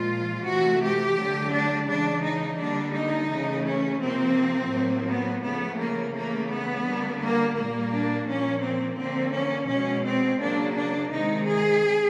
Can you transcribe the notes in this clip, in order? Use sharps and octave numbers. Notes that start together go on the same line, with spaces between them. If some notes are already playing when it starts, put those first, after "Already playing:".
Already playing: A#2 F3 G#3 F4
C3 E3 A3 F#4
G4
D3 F#3 A3
D4
C#3 E3 G#3 D4
D#4
D3 G3 A#3 D4
D#4
C#3 E3 A3
C#4
C3 F3 A#3 C4
A2 F#3 A#3
B3
C#3 F3 A3 B3
A#3
C#3 E3 A3 A#3
B3
D3 G3 A#3
A#3
A#2 G3 A#3
D4
A#2 F3 A#3 C#4
C4
D3 F3 A#3 C4
C#4
B2 G#3 C#4
C4
C#3 F#3 A#3 D4
D4
C3 D#3 G#3 D#4
G#4